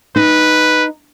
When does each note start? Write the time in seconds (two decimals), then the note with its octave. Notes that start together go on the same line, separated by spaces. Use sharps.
0.16 D#4 B4